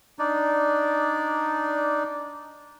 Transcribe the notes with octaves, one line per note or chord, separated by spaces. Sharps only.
D4 D#4 D5